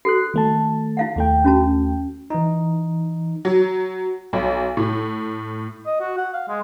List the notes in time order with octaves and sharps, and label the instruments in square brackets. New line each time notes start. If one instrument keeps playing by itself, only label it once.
[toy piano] F#4 A4 [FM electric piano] F#6 C7
[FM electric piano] D#3 A3 A5
[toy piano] E4 F5 F#5
[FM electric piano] D#2 A3 G5
[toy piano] C#4 F#4 A5
[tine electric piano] E3 D#4
[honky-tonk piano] F#3
B1
A2
[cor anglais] D#5
F#4
F#5
F5
G#3